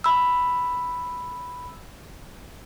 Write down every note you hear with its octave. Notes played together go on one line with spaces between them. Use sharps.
B5 E6